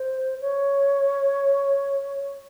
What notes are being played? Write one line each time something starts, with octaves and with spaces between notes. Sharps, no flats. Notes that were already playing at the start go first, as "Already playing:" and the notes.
Already playing: C5
C#5